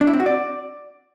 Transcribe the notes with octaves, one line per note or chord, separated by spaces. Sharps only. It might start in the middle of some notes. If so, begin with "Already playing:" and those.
D4
E4
C4
F#4
D5